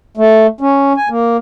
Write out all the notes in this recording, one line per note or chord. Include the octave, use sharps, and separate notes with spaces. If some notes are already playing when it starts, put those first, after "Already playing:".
A3
C#4
G#5
A#3